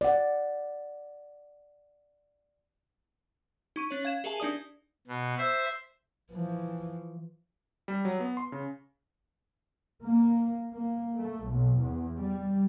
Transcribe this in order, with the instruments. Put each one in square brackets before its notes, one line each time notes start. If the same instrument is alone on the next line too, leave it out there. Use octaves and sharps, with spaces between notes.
[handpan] D5 F#5
[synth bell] D#4 C#6 D#7
C#4 C#5
F5 G#6 E7
G4 G#4 A#4 E5 G#5 A5
D4 D#4 D5 D#6
[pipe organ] B2
C5 E5
[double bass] E3 F3
[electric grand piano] G3
F#3
B3
C6
C#3
[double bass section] A#3
A#3
A3
B1
E2
G3